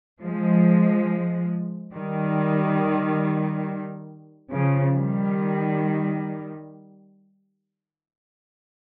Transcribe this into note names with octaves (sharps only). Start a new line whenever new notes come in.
F3 G#3
D#3 G3
C#3 F3
D#3 G3